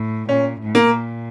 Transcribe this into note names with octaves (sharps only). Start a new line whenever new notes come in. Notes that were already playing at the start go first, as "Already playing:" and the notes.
Already playing: A2
A#2 C#4
A2
A#3
A#2